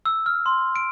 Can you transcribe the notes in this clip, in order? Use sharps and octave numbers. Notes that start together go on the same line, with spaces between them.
E6
F6
C6
D7